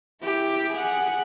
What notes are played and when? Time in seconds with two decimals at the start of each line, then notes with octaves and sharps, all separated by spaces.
0.23 E4 G4
0.72 G#4 F#5